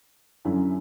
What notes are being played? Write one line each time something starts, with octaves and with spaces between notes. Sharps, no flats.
F#2 D3 F#3 C#4 E4